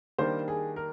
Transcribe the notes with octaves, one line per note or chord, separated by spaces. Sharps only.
D#3 G3 A#3 D4 C5
G#4
A#4